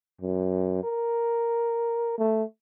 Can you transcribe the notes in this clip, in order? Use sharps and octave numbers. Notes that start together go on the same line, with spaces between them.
F#2
A#4
A3